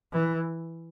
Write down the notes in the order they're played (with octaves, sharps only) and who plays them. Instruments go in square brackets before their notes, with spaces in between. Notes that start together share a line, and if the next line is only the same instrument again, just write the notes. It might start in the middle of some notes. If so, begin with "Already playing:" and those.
[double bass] E3